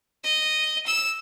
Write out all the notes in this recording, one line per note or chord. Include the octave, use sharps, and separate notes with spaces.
D#5
E6